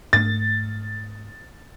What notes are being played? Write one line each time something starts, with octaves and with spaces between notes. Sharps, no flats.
G#2 A3 A6